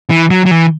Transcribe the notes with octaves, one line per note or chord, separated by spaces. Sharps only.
E3
F#3
F#3
E3